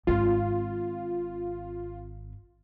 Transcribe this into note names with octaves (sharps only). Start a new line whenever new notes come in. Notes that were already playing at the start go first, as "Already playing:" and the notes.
G#1 C4 F4